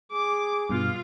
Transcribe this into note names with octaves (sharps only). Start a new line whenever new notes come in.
G#4 D6
G2 B2 F4 F5